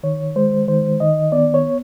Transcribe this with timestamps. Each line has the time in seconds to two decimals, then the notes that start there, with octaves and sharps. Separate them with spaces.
0.03 D#3 C#5
0.36 G#3 C5
0.68 D#3 C5
1.00 D#3 D#5
1.32 B3 D5
1.54 C#5